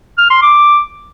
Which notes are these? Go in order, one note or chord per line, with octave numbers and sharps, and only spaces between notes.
F6
C6
D6